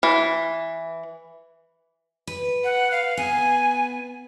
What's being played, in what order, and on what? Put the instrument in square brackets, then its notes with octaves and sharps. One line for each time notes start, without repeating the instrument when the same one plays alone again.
[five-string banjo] E3
[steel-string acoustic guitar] B4
[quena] F#5
F5
[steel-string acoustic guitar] B3 [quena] G#5